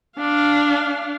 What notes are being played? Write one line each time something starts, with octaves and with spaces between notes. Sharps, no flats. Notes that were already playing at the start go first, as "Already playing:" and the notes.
D4 F5